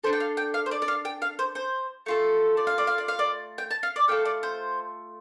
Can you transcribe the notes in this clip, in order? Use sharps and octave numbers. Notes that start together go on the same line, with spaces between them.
D4 A4 C5
G5
F5
G5
F5
C5
D5
D5
F5
G5
F5
C5
C5
A3 F4 A4
D5
F5
D5
F5
D5
F5
D5
G5
A5
F5
D5
A3 F4 A4 G5
D5
C5